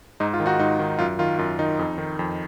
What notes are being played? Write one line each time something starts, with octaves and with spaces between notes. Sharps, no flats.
G#2 D#4
F4
D#3
D#4 F#4
G#2 D#4
D#3
F#2 F4
D#3 F4
F#2 F4
D#3 D#4
F2
D#3
F2